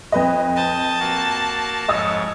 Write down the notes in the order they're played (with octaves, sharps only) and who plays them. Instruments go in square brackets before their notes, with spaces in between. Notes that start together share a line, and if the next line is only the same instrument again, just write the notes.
[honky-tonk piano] F2 B4 D#5
[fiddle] A5 [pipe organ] D#6 G6
[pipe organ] A#3 F#4
[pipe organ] F2 G#2 C#5 [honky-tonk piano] D#5 D#6 E6